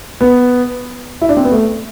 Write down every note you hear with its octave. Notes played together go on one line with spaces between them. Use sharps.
B3
E4
D4
C4
B3
A3